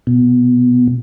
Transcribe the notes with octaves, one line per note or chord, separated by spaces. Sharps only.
B2